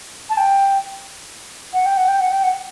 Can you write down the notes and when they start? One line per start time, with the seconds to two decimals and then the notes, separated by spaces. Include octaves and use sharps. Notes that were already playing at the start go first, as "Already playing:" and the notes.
0.30 A5
0.37 G5
1.73 F#5
1.86 G5
1.97 F#5
2.08 G5
2.20 F#5
2.31 G5
2.43 F#5